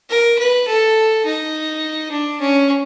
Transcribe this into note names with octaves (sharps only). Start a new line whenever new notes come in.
A#4
B4
A4
D#4
D4
C#4